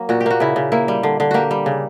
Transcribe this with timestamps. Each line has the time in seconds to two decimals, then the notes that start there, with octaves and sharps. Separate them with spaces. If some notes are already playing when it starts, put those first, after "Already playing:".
Already playing: F#3 A#3
0.09 A#2 F#4
0.21 G4
0.26 A#3 F#4
0.40 C#3 E4
0.56 C#3
0.72 A#3 E4
0.88 G3
1.03 D3
1.20 D3
1.31 A#3 F#4 G4
1.51 G3
1.66 C#3